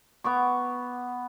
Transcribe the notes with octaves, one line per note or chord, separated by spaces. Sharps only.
B3 C#6 D6